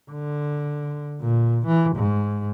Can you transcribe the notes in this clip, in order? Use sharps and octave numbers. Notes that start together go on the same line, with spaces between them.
D3
A#2
E3
G#2